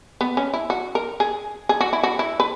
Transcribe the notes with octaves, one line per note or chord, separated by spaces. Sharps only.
B3
C#4
E4
F#4
A#4
G#4
G#4
F#4
E4
F#4
E4
B4